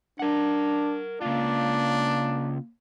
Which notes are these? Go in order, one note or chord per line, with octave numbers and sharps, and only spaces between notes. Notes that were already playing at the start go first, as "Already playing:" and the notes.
D4 A#4 F#5
C#3 A#3 D4 F4